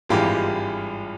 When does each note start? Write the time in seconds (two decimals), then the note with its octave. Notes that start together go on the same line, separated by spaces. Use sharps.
0.09 G#1 G2 E3 G#3 F4 G4